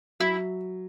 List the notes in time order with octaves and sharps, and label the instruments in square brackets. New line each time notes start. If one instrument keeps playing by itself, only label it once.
[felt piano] F#3 [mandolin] E4